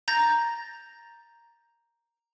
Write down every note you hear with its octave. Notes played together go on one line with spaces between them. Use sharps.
A#5 G6 A6 A#6